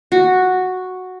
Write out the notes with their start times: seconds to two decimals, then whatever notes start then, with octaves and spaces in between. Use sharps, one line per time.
0.12 F#4